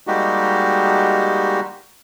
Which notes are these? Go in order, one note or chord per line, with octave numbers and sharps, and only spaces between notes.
G3 G#3 A#3 D#4 F#4 G4